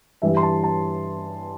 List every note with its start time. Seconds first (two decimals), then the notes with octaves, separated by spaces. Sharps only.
0.22 G2 E3 G3 E5
0.37 C6
0.43 A5
0.63 A5